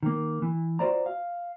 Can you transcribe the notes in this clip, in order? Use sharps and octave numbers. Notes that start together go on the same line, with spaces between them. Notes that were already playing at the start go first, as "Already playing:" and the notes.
D#3 A#3
E3
F4 F#4 A#4 C5 D5 A#5
F5